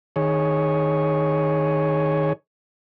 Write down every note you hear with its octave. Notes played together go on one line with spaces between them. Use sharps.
D#3 G#4 C#5